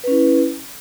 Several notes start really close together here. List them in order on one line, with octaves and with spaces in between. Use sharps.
B4 C#4 E4